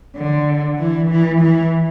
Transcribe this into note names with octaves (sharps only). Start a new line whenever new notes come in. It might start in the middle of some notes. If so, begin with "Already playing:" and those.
D3
E3
E3
E3